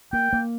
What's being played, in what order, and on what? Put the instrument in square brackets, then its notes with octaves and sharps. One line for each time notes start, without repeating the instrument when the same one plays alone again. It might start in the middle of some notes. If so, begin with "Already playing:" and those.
[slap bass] A#3 [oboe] G5
[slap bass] A#3